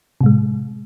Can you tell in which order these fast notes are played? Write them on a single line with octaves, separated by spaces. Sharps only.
C3 A2 G#3